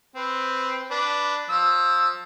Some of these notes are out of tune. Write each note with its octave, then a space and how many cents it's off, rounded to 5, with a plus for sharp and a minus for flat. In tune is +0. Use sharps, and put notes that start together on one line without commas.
C4 +0 B4 +10
D4 +0 B4 +0
F3 +20 E6 +0